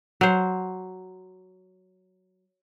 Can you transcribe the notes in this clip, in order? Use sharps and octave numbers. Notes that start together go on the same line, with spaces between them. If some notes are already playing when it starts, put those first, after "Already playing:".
F#3 C5